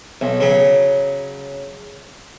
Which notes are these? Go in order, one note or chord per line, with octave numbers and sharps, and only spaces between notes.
B1
C#3 F#3